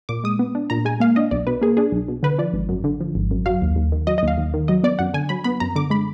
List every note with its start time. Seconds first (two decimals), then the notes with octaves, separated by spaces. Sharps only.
0.09 A#2 D6
0.24 G#3 D#6
0.39 B3
0.55 D4
0.70 A#2 A#5
0.85 G#3 G#5
1.00 A#3 F5
1.16 D4 D#5
1.31 B1 D5
1.47 B2 B4
1.62 A#3 G#4
1.77 D4 G#4
1.92 B1
2.08 B2
2.23 D3 B4
2.38 F3 D5
2.53 G#1
2.69 F#2
2.84 D3
3.01 F3
3.15 G#1
3.31 F#2
3.46 F#3 F5
3.62 D#2
3.76 D#2
3.92 D#3
4.07 F#3 D#5
4.18 D#5
4.23 D#2 F5
4.38 D#2
4.54 D#3
4.68 F#3 D#5
4.83 B3 D5
4.99 F#2 F#5
5.14 D3 G#5
5.29 F#3 B5
5.44 B3 B5
5.60 F#2 A#5
5.76 D3 D6
5.90 G#3 B5